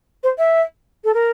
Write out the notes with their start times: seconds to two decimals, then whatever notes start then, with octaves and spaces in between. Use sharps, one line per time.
0.23 C5
0.38 E5
1.04 A4
1.14 A#4